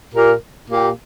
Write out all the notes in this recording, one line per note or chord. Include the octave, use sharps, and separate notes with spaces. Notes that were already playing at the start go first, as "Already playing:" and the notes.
A#2 A#3 G4 A#4
A#2 A#3 G4